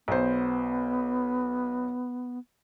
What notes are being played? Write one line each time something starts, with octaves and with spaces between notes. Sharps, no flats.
B1 B3 C5